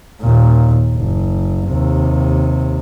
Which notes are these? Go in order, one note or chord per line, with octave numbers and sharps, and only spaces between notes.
D#2 A#2
F#1
D#2 C3